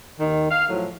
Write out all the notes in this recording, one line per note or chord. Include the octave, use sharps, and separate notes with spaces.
D#2 D#3
F5
A2 F3 F#3